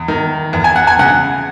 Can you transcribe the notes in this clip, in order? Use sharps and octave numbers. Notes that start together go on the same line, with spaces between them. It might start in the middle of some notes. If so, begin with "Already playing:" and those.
Already playing: E2
D#3
E2
G#5
F#5
G#5
C#3 F#5